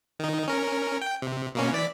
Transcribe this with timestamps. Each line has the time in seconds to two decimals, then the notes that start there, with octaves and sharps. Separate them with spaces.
0.19 D#3 D#4
0.48 C#4 A#4
1.02 G5
1.22 C3
1.55 B2 A#3 C#4
1.72 E3 D5 B6